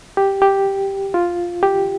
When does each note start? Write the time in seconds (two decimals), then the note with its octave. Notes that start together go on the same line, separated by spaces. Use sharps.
0.17 G4
0.42 G4
1.14 F4
1.63 G4